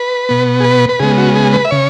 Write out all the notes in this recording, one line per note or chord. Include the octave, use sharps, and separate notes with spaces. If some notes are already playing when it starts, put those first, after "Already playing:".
Already playing: B4
B2 B3
G#4
B4
B4
C#3 G#3 B3 G#4
F#4
G#4
B4
E5
C#3 C#5